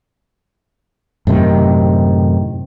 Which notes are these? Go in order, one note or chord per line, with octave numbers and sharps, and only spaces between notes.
F#2 A2 C3 D#3